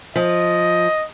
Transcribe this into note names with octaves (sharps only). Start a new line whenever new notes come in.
F3 D#5